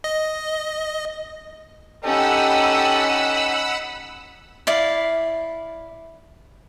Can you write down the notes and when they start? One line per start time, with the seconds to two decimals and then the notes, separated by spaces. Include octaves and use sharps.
0.04 D#5
2.04 C#4 D#4 G4 A4 F#5 G5 B5 E6
4.67 E4 D5 F5